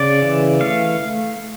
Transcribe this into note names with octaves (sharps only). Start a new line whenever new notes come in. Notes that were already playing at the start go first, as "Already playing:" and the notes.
Already playing: C#3 D5
E3
A3 F5